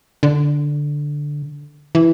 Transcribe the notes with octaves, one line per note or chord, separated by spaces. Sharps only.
D3
E3